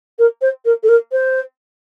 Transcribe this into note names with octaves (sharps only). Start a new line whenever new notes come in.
A#4
C5
A#4
A4
A#4
C5